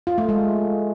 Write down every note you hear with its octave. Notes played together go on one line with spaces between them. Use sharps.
F4
A3
G#3